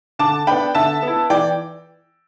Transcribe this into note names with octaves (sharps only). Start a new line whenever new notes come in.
D3 A5 D6
B3 D4 G5 B5
D3 E5 A5
B3 E4
E3 D5 G5